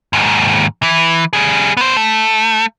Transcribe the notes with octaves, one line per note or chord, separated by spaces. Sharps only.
D#2 G#2
E3
G3 G#4
B3 C5
A3